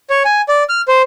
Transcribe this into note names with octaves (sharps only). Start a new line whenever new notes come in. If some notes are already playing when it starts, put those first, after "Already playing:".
C#5
G#5
D5
F6
C5